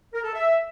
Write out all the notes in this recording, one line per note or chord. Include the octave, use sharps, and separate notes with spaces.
A#4
A4
E5